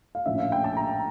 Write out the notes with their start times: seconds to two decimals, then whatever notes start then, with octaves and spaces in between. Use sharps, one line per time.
0.15 F5
0.26 A#1 A2 F3 C#4 E5
0.38 F5
0.52 G5
0.64 A5
0.77 A#5